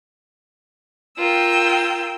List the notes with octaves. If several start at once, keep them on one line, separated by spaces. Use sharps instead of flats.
F4 A#4 G5 E6